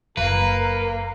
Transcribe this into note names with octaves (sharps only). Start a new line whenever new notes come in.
F#1 A#3 A#4 B4